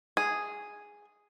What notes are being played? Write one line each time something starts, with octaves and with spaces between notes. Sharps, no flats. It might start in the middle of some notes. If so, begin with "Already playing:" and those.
G#4